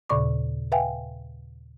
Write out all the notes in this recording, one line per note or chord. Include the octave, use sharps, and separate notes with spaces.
D#2 A#2 C#3 D5 C#6 D6
B4 E5 F5 G5 G#5